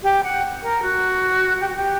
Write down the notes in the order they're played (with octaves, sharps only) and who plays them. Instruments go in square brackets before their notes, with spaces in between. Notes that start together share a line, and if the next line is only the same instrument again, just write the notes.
[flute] G4
F#5
A#4
F#4
G4
F#4
G4